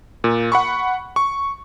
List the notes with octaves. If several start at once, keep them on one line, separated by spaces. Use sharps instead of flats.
A#2
F#5 B5 C#6
C#6